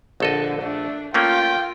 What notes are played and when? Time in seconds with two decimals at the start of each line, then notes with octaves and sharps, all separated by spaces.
0.20 A#1 D3 A4 D#5
0.62 A3 D4
1.14 A3 A#3 C#4 F4 G5